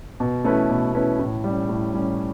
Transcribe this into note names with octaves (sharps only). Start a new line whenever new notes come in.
B2
A3 C#4 E4 B4
B2
A3 C#4 E4 B4
A2
G3 C#4
A2
G3 C#4